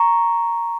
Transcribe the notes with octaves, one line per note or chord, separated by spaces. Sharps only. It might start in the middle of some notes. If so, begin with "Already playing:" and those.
Already playing: A#5 C#6